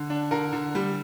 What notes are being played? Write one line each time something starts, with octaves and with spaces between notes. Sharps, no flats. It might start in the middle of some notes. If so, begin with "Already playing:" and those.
Already playing: D3
D4
D3 A#4
D3
G3